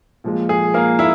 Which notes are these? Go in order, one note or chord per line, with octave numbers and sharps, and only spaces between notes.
A#2 F3 G#3
G#4
A#3 A#4
A#2 E4 E5